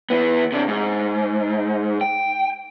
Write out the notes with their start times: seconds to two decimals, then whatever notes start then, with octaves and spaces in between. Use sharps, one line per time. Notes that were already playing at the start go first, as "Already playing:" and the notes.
0.10 E3 B3
0.52 C3 D4
0.68 G#2
2.01 G5